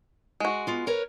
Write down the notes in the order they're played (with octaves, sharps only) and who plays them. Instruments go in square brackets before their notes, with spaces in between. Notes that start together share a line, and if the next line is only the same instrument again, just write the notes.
[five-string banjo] G#3 F#4
[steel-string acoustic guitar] B3 F4
A#4 B4 C#5